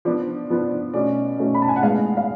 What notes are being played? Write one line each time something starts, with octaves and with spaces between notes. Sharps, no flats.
F3 B3 D4 D5
F3 B3 D4
B2 A3 C#4 D5
B2 A3 C#4
B5
A5
G#5
F#5
A2 G#3 B3 F5
F5